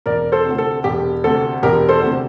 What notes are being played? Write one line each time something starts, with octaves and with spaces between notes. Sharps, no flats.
E1 A#4 D5
A4 C5
D2 C3
A4
E1 G4
D2 C3 A4
E1 G4 A#4
A4 C5
D2 C3